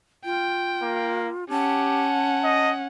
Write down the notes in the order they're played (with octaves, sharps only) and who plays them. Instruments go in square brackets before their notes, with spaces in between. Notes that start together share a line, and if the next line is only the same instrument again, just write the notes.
[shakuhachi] F4 [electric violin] G5
[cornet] A#3
[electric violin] C#4 F#5 [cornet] G4 [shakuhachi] A5
[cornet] D#5